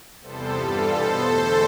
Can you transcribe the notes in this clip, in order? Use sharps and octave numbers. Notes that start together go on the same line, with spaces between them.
E2 C3 G3 B3 A4 C5
G2 E3 G3 F4 A4
B2 B3 A4 C5
E2 D3 A3